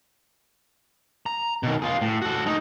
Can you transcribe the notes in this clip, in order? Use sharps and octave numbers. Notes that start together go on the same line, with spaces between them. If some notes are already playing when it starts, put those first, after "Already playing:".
A#5
B2 D#3
F4 G#4
A2
F#4 A4
A3 D#4